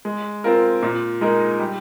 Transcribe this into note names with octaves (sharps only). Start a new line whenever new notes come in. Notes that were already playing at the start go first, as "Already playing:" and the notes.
G#3
C4 F4 A#4
A#2
G#3 D#4 A#4
G3